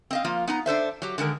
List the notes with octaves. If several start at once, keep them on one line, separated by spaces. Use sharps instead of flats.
C4 D#5 F5
F3 A#3 F4
B3 D#4 A#5
D4 A4 C5 E5
F#3 G4
D3 D#3 G#3 A#4